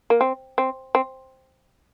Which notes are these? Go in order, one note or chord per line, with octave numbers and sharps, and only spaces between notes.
A#3
C4
C4
C4